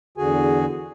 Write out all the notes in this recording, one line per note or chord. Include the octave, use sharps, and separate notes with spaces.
E2 D3 F#4 G#4 G#5